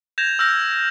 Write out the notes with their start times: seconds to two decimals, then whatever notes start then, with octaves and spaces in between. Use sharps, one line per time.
0.18 G6 G#6 A#6 E7 F7
0.39 E6 F6 G6 A#6